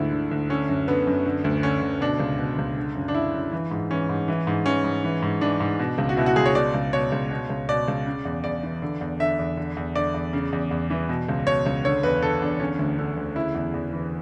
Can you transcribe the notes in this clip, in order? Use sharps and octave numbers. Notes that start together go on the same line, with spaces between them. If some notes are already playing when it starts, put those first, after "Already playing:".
Already playing: D2 G#2 D3 E4
D3
D2
D3 C#4
F#2
D3 B3
F#2
D3
D2
D3 C#4
D2
B2 D4
C#2
B2
C#2
D3
F#2
D4
D3 E4
F#2
E3
G#2
E3 C#4
G#2
E3
G#2
E3 C#4
G#2
E3
G#2
E3 D4
G#2
B2
C#2
F#4
B2 E4
F#4
C#2 G#4
C#5
B2 D5
C#2
B2 C#5
C#2
B2
C#2
B2 D5
C#2
C#3
E2
E2 D5
E3
D3
E2
D3 E5
E2
D3
E2
D3 D5
E2
C#3
E2
E2
E3
B2
C#2
B2 C#5
C#2
D3 C#5
E2 B4
D3 A4
E2 D4
D3 C#4
D2
D3
D2
C#3 E4
E2
E2
E3